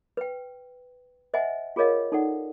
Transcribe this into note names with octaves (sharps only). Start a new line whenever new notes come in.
B4 G5
C5 D#5 E5 F#5 G#5
F4 G#4 A#4 C#5 D#5 F5
D#4 A4 D5 F#5